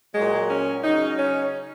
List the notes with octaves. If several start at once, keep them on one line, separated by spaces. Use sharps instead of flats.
A#2 F#3 G#3
C#4
C#3 F#3 D#4
C#4